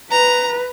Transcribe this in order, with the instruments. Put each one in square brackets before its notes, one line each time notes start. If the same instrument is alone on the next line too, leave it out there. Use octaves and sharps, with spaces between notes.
[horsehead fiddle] B4 [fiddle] A#5